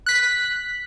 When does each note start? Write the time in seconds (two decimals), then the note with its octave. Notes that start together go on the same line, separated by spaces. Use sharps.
0.06 F#6 B6